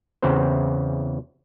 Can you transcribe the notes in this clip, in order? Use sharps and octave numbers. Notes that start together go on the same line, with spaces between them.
E2 C#3 E3 C4 C5